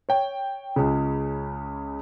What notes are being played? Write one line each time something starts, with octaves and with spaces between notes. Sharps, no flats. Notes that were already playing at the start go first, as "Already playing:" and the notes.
C#5 G5
C#2 C#3